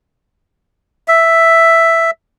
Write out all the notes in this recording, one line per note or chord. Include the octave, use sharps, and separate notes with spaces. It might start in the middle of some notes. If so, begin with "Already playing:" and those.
E5